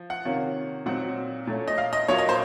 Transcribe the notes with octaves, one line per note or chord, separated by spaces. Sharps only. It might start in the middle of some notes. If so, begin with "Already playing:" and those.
Already playing: F3
F#5
C3 D#3 A#3 C#4 F4
A#2 F#3 C4 D#4 F#5
A#2 A3 C#4
D#5
F5
D#5
A#2 F#3 A#3 F4 C#5
D#5
C5